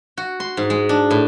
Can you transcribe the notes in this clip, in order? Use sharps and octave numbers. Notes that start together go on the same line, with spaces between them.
F#4
C6
G#2
G#3
D4
A2